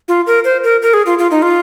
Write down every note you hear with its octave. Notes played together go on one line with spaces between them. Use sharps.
F4
A#4
C5
A#4
A#4
G#4
F4
F4
D#4
F4